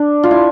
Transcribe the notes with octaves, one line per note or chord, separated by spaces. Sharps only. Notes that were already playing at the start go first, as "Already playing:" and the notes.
Already playing: D4
F4
E4